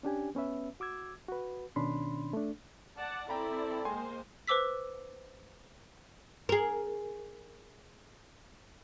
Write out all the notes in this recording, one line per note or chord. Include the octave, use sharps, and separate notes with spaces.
C#4 D4 G4 G#5
B3 C#4 B4 E5
F#4 D6 E6 G#6
F#4 B4
B2 D#3 C#4 D4 B5 C6
A3 D4
D5 F#5 A5
C4 E4 A4 D5 G5 A#5 B5
G#3 A#3 C5 G5 G#5 C6
B4 C5 D6 E6 B6
G#4 A#4